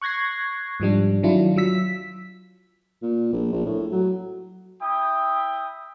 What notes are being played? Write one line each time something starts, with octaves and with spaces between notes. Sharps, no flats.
C#6 F#6 G#6 A#6 C7
G#2 F3 G3 D4
D#3 F#3 D4 E4 F4
F#3 F4 E6 B6
A#2
A#1
A#1
A2
F#3
E4 G5 D#6